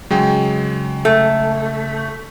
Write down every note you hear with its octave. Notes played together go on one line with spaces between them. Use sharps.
C#3 F#3 G#3 G5
A3